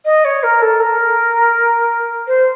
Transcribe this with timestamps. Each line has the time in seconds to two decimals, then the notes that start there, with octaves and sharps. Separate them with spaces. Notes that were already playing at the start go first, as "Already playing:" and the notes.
0.05 D#5
0.24 C#5
0.43 A#4
0.61 A4
0.80 A#4
2.27 C5